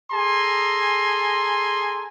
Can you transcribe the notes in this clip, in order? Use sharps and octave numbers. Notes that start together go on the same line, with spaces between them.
G#4 A4 G#5 A#5 C6